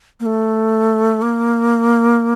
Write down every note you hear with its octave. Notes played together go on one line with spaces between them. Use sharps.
A#3
A3
A#3